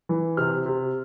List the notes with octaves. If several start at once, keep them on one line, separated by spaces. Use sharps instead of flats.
E3
C3 F6
C3